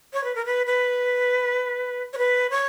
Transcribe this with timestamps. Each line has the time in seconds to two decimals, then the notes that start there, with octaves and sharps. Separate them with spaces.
0.13 C#5
0.24 B4
0.35 A#4
0.46 B4
0.66 B4
2.13 C#5
2.18 B4
2.51 C#5